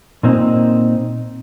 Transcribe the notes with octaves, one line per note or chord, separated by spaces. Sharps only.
A#2 A#3 C4 D#4